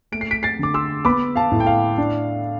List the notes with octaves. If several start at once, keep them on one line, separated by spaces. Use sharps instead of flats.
A3 D7
C7
B6 D7
A6 C7
D3 D6
C6 E6
B3 B5 D6
F5 A5
A2
G5
F5
D4